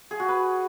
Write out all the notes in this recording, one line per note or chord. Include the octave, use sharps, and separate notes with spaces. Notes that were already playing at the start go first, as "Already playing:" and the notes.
G#4
F#4
B4